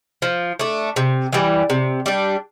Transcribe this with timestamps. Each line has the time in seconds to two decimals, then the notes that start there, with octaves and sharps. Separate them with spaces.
0.22 F3
0.59 A3 D4
0.96 C3
1.33 E3 G3
1.70 C3
2.06 G3 D4